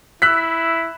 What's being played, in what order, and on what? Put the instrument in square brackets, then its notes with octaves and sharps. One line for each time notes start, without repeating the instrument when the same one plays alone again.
[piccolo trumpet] E4 [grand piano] E6 F#6 B6